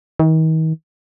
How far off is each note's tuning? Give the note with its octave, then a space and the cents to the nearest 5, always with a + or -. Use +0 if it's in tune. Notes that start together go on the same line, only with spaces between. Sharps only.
D#3 +40